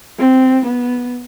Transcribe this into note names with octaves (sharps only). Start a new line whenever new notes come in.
C4
B3